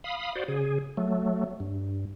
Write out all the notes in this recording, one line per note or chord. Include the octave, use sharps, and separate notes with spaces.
F5 B5 D#6
F#4 C5 D5
C#3 G#4
F#3 A3
G2